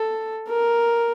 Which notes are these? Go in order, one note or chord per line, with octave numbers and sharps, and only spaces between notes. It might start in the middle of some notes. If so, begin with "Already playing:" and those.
Already playing: A4
A#4